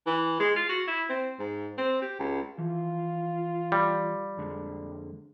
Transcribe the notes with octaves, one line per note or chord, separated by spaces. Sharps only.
E3
G#3
F4
F#4
E4
C4
G#2
C4
G4
C#2
E3 F3 F4
G3
F2 D3 G#3